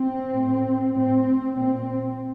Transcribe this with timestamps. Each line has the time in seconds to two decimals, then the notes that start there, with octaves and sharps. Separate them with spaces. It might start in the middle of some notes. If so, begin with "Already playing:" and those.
Already playing: C4
0.32 A2
0.94 A2 C4
1.56 A#2 C4